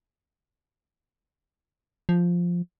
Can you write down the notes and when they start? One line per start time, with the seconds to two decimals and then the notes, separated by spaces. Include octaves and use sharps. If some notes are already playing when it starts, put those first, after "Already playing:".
2.09 F3